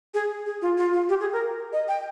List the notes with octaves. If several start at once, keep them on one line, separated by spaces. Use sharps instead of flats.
G#4
G#4
F4
F4
F4
G4
G#4
A#4
D#5
G5